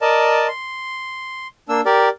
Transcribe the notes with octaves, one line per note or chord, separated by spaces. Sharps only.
A#4 D5 D#5 A5
C6
A#3 D4 E6
G4 A#4 D5